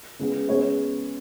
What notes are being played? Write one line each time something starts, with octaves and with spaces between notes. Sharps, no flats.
C#3 G#3 B3
C#3 G#3 B3 C#5